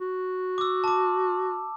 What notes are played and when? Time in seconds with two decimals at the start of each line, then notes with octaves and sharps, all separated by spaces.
0.01 F#4
0.58 D6 E6
0.84 A5 D6